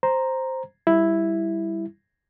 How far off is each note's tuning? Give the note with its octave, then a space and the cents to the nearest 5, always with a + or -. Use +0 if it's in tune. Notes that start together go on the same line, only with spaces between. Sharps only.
C5 +0 A#5 +0
G3 +0 E4 +0